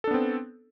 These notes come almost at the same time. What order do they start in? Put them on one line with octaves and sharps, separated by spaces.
A4 D4 B3 C4